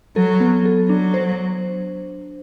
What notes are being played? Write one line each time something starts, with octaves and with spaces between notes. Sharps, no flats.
F#3 A4
B3
A4
F#3 D4
C5